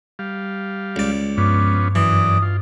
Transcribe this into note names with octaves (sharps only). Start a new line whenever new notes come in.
G3 F5
C#2 D5
G2 F3 B3 C#4 D6
F#2 E3 D5 D#6
F4